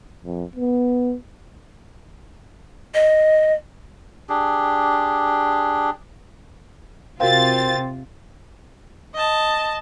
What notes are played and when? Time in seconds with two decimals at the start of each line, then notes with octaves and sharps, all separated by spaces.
0.24 F2
0.56 B3
2.94 D#5
4.29 D4 G4 G#4
7.20 C3 C4 F4 F#4 A#4 F5 A6
9.14 D#5 A5